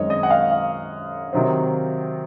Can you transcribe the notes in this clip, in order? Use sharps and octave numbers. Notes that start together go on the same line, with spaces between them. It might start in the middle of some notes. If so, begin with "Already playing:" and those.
Already playing: F#2 D#3 G#3 C4 C#5 D#5
D#5
F#5
F5
F5
C3 D#3 F#3 C4